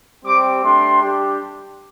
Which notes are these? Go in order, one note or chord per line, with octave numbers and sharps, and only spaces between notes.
G3 C4 G4 D6
A3 D4 G4 C6
G3 D4 G4